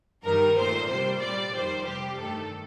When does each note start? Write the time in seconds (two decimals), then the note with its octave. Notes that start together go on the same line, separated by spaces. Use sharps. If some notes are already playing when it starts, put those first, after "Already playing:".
0.24 G2 D#3 G3 A#4
0.56 A#2 A3 C5
0.89 C3 G3 C5
1.21 A#2 G3 D5
1.53 F2 D#3 G3 C5
1.86 C3 G3 G4
2.18 G2 D#3 A3 A4